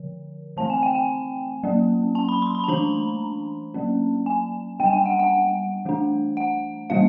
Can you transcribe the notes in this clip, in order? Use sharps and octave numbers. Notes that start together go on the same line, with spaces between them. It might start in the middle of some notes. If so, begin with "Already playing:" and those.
Already playing: D3 F3
E3 A3 C4 A5
G#5
G5
G#5
F#3 A#3 C#4
A5
B5
C6
B5
A5
E3 A3 D4 A#5
F#3 A#3 C#4
G#5
G3 B3 D4 G5
G#5
G5
F#5
F#5
E3 A3 D4
F#5
E3 G3 A#3 C#4 F5